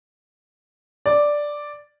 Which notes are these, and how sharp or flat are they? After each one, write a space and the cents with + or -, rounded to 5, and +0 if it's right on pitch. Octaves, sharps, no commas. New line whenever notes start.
D5 +0